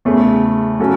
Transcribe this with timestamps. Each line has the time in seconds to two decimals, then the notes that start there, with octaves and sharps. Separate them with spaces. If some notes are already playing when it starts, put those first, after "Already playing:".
0.05 E2 C#3 A3
0.80 C#3 F#3 C#4 F#4 A4